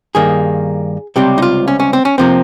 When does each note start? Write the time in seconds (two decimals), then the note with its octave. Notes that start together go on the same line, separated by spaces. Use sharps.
0.15 G2 D#3 A#3 G#4
1.16 C#2 C3 G3 C4 G4
1.38 D#4
1.42 F4
1.68 C#4
1.80 C#4
1.93 C4
2.05 C#4
2.18 C3 F3 A#3 C4